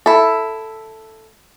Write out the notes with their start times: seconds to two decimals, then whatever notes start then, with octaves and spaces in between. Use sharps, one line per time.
0.06 E4 A4